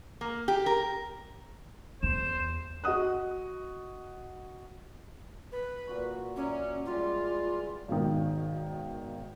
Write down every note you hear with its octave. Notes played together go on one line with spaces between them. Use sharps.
A#3
G4
A#4
E2 C5 E7
F#4 D#5 F#5 D#6 F#6
B4
A#2 F#4 C#6
F#3 C#4 D5 E5
E3 G3 G#3 F4
B4
G#1 B2 D#3